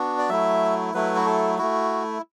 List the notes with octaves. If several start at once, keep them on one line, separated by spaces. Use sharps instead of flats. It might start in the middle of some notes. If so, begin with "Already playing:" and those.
Already playing: B3 D4 F#4
D5
F#3 A3 E4 E5
F#3 A3 E4 B4
F#4
A4
A3 E4 F#4